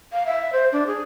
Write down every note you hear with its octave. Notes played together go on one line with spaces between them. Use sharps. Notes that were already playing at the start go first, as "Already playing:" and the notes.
F5
E5
C5
D4
G#4